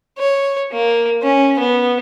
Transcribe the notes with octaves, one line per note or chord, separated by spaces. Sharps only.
C#5
A#3
C#4
B3